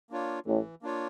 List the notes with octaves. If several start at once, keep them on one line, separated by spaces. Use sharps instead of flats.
A#3 D4 F4 C#5
A1 A2 E3
A#3 D4 F4 C#5